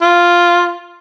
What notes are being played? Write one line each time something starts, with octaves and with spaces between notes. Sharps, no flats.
F4